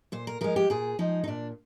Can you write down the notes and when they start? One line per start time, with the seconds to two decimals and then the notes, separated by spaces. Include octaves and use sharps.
0.12 A#2 C5
0.27 A#4
0.41 F3 G#3 A#4
0.56 G4
0.70 A#2 G#4
0.99 F3 G#3 D#4
1.24 D#4
1.27 A#2 D4